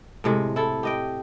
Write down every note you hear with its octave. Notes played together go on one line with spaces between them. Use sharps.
A2 C3 G#3
E4 A4
G4 D#5 G5